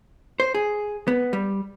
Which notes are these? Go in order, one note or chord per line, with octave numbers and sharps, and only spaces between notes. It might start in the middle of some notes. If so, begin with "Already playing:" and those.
C5
G#4
B3
G3